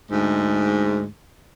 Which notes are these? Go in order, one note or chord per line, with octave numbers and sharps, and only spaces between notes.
D2 G#2